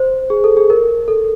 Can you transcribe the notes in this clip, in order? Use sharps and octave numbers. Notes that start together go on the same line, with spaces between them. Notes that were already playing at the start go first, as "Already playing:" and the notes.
Already playing: C5
G#4
A4
G#4
A#4
A4